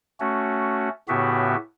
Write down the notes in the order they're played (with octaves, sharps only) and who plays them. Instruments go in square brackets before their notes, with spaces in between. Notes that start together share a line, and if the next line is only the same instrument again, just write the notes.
[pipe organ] A3 C#4 F#4
A2 C#3 B3 F#4 G4 E5